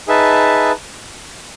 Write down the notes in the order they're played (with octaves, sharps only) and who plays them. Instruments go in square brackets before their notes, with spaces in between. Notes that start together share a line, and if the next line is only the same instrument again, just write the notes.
[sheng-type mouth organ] D#4 G#4 B4 E5 A5